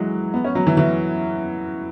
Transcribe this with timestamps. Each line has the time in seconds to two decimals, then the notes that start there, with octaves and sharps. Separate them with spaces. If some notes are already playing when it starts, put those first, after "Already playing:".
Already playing: E3 F#3 G#3
0.34 B3
0.45 C#4
0.55 F#3
0.67 E3
0.77 E3